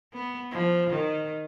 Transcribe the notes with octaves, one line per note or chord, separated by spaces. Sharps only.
B3
F3
D#3